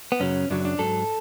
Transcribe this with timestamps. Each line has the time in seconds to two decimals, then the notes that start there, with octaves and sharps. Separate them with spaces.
0.12 B3
0.20 F#2 C#3 F#3 C#4
0.50 F#2 C#3 F#3 D4
0.65 D4
0.79 G#2 F#3 A4